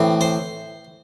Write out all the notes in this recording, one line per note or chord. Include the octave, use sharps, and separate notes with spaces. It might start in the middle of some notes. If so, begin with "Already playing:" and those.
Already playing: A2 E3 C4
C5